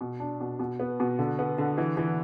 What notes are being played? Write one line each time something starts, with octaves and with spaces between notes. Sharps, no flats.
B2
D4
B2
B2
B3
B2
D3
B3
D3
E3
E3